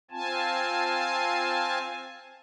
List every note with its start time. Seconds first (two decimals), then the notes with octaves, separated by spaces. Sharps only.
0.11 C4 F4 G#5 A5